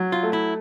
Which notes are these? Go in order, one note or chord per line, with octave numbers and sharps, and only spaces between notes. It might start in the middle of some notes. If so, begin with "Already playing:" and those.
Already playing: F#3
F4
A3
E4